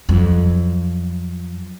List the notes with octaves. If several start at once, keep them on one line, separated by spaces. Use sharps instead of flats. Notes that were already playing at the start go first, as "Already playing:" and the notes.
F2 F#3